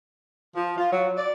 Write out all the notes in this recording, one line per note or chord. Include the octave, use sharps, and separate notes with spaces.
F3
F4
F#3
D5